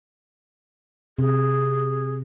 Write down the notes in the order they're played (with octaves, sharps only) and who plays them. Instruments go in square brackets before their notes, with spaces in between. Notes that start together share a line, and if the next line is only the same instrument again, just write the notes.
[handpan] C3 [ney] G#4